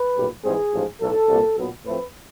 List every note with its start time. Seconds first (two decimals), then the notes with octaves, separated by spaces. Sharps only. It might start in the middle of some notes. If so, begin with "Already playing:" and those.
Already playing: B4
0.16 B1 A#2 G3
0.44 G#2 E3 G3 C4 G#4
0.73 A1 G#2 F3
1.00 B1 A2 F#3 A4
1.28 C2 A#2 G3 A#3
1.57 B1 A#2 F#3 B3
1.85 A2 F3 A3 C4 B4